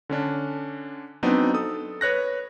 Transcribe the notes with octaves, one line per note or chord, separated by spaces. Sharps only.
D3 C#4 D4
F#3 B3 C4 D4 D#4
A4 D#6
B4 C#5 F#6 A#6